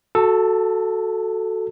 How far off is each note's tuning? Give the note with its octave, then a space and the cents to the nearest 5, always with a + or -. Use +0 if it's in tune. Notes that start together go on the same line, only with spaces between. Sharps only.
F#4 +0 A4 +0 A5 +35